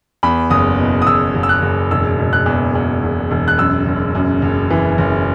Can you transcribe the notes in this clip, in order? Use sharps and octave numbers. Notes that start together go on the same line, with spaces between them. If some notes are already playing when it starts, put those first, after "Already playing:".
E2 B5
F#1 D#6
B2
D#6
F#1 E6
F#1
E6
F#6
F#1
E1 E6
E1
F#6
E2
E2
E1
E1
F#6
F#2 E6
F#1
F#2
F#1
E3
F#1